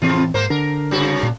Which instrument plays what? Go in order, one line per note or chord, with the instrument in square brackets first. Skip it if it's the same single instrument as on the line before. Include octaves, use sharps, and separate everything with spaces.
[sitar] F2 C3 F4 [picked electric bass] A2 E3 C4
[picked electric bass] G#2 [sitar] A#3 A#4 C5
[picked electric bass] D3 D4 [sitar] A#4
[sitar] G2 C#3 F#4
[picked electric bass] A#2